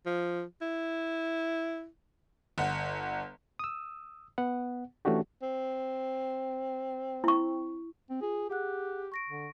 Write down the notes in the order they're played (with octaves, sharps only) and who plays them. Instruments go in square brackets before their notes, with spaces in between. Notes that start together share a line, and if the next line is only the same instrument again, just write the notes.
[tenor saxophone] F3
E4
[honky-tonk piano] G1 F#5
[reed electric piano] D#6 E6
B3 F#5
E3 A3 C#4 D4 F#4 G4
[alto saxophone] C4
[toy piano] E4 C#6
[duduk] C4
[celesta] F4 [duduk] G#4
[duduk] G4 [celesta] G#4 F#5 F#6
[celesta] C#6 A#6 D7
[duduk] D3